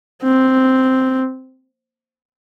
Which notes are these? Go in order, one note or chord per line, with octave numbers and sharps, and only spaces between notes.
C4